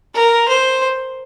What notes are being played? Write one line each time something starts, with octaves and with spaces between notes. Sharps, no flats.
A#4
C5